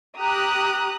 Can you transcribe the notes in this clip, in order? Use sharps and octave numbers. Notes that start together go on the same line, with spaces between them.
G4 A#5 D#6 F#6